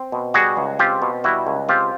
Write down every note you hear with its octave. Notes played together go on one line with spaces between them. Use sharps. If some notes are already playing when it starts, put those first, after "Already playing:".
Already playing: C4
B2
G3 F#4 G#4
C#2
C4 F4 G4
B2
G3 E4 F#4
C#2
C4 F4 G4